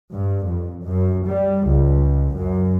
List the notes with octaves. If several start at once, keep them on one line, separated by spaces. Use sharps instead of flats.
G2
F2
F#2
G3
C#2
F#2